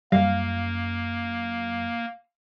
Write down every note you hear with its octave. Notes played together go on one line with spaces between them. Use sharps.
F#2 G3 A#3 F5